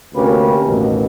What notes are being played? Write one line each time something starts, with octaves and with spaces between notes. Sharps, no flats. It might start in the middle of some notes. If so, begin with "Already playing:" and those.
D2 C3 A#3 C#4 G4 B4
A1 D#2 B2